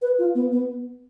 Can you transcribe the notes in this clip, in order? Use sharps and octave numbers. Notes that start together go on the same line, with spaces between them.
B4
F4
B3
B3